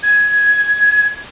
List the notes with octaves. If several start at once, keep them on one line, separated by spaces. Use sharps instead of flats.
G#6